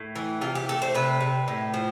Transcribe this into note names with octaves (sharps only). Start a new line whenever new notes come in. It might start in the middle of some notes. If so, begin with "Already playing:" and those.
Already playing: A2
E3
C3 F4
G4
A3 A4
C5
C3 B4
C3
A2
F3